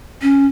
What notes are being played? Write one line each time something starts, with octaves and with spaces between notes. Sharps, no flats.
C#4